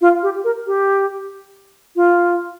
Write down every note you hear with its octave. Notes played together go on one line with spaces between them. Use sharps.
F4
G4
A#4
G4
F4